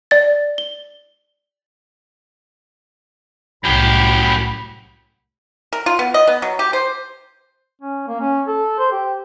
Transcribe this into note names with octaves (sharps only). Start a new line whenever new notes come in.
D5 A6
G7
C2 F#2 A2 G4 B5
A#4
F4
B3
D#5
B3
F#3
G4
C5
C#4
A#3
C#4
A4
C5
G4